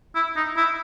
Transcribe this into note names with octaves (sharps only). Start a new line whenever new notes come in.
E4
D#4
E4